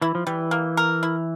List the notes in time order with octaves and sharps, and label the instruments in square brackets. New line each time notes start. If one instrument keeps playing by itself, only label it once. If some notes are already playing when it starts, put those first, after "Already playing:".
[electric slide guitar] E3 [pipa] E4
[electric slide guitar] F3
[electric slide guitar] E3 [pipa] G3
[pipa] A#3
A#4
E4